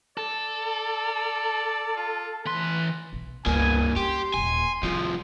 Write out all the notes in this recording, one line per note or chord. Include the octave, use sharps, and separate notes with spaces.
A4 D5
F4
E3 B4 C6
B1
C#2 G2 A#3 B3 G#5
C#4 G4 C6
D#1 G#2 G#5
C2 F3 F4